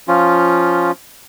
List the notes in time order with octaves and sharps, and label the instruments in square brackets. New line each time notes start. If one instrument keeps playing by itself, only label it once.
[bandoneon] F3 C#4 F4